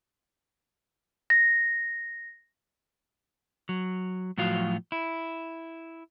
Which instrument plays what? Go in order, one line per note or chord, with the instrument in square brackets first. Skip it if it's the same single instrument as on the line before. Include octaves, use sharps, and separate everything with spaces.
[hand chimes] A#6
[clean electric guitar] F#3
A2 F3 F#3 F4 F#4 F5
E4